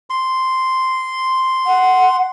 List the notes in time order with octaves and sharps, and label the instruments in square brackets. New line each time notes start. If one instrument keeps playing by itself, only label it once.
[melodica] C6
[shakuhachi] F#5